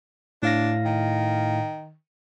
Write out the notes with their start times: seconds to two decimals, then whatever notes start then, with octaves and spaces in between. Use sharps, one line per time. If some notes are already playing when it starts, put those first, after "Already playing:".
0.43 A2 D4 F5 A#6
0.85 D#3